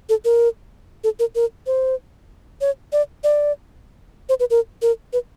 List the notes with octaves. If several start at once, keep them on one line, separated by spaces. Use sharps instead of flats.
A4
A#4
A4
A#4
A#4
C5
C#5
D5
D5
C5
B4
A#4
A#4
B4